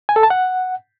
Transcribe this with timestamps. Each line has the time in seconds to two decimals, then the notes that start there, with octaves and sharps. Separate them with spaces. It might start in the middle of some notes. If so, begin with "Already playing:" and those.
0.09 G#5
0.16 A4
0.23 A5
0.30 F#5